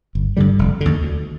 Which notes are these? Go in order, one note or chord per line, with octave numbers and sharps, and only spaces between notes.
G1
G2 D3 G3
F1
D#2 D3
D2